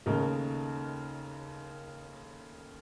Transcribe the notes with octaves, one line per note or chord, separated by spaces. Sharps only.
D#2 C#3 A3 D#4 A#4